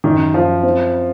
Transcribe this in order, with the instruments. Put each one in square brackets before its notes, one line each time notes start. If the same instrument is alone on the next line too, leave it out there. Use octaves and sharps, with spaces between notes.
[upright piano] F#2 [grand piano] D#3
[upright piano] F#2 [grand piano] F3
[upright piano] C4